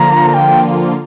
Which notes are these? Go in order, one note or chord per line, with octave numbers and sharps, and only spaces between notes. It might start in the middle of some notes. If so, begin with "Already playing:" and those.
Already playing: D3 F3 A#3 F4 A#5
G5